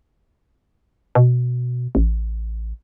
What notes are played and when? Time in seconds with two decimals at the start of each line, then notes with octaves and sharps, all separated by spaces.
1.15 B2
1.95 A1